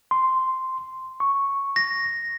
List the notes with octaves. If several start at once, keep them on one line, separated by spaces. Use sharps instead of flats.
C6
C#6
A#6